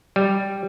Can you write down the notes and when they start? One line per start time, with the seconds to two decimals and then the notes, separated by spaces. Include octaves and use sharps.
0.16 G3